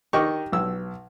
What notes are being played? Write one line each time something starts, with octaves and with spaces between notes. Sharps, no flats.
D#3 G4 D#5 C#6
B1 E6